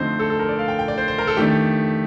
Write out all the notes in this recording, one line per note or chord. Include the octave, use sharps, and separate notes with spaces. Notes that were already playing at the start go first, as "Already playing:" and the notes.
Already playing: F2 D3 A3 C4 D#4 C5
A4
A4
A#4
D5
F5
G5
G5
D5
C5
C5
A#4
A4
F2 D#3 A3 D4 G4